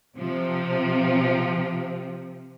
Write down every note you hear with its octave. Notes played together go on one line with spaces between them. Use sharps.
C3 F3